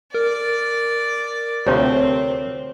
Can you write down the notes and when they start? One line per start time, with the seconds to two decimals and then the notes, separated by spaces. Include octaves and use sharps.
0.14 A#4 D5
1.67 D2 C3 F3 C4 G4 C#5